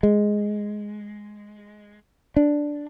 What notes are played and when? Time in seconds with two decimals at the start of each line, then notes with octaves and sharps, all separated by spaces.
0.03 G#3
2.36 D4